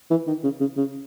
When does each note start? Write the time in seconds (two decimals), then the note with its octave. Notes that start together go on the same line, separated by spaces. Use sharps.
0.10 E3
0.27 D#3
0.43 C#3
0.60 C#3
0.77 C#3